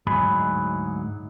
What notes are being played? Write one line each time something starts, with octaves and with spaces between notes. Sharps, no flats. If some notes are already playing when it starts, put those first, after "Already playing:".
D2 G#2 F#3 D#4 G#4 B5